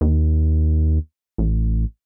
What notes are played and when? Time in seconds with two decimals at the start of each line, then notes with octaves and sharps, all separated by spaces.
0.01 D#2
1.38 A1